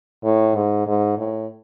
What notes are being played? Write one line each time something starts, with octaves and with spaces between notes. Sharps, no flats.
A2
G#2
G#2
A2